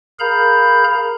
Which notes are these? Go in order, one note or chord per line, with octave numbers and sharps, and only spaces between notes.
G#4 A#4 F5 A#5 B5 G6